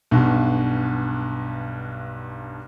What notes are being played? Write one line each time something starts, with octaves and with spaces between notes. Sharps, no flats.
B1 G2 B2